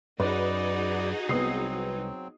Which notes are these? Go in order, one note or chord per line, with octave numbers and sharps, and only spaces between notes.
F#2 D#4 F#4 G#4 B4 D5
C2 F#3 B3 C4 D#6 C7